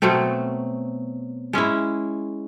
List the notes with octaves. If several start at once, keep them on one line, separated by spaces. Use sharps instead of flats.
B2 F#3 A3 C4
G#3 C#4 E4